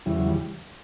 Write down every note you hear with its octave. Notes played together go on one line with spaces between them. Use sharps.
E2 C#3 E3 G3
F#3
G3